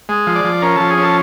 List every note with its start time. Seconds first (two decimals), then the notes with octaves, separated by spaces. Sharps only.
0.09 G#3
0.27 F3
0.35 D5
0.44 F3
0.62 C#4 A#4
0.76 F3 A4
0.90 G#4
0.98 C#4
1.03 A4